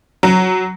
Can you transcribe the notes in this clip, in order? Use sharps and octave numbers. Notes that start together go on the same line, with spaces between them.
F#3